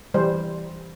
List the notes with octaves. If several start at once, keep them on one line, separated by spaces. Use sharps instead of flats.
E3 G3 C5